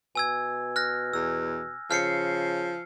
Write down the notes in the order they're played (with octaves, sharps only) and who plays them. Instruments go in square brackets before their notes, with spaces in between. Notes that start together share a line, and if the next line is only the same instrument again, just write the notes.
[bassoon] B2 [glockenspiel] G#5 E6 G#6
[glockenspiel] F6 F#6 A#6
[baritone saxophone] E2 [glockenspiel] E6
[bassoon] C#3 [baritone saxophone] F3 [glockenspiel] F6 C7 C#7